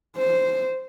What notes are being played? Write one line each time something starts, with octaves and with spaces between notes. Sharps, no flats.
C5